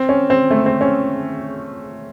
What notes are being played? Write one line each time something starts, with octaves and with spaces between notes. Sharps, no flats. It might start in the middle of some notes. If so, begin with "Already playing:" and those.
Already playing: C4
C#4
C4
A3
C4
C#4